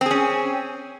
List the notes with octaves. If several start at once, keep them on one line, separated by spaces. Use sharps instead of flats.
C4 C#4 G#4